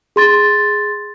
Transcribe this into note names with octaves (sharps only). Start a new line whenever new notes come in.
G#4 C6 A6